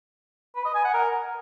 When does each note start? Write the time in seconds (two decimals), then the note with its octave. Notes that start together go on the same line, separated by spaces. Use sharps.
0.55 B4
0.65 D#5
0.75 G#5
0.84 F#5
0.94 A#4